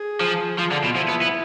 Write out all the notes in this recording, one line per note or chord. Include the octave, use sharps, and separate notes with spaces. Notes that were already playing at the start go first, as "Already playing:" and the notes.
Already playing: G#4
F3
F3 F4
D3
B2
F3 E4
B3
B3